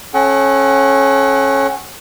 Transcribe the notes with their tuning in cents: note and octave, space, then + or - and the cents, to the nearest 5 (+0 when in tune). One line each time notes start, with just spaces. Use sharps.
C#4 -20 A4 -35 F#5 +20